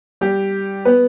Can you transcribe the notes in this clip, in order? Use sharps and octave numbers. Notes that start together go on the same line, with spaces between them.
G3 G4
B3 B4